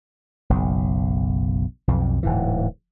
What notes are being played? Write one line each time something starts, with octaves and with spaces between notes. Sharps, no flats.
F#1 B1
B1 F2
D1 G#2 E3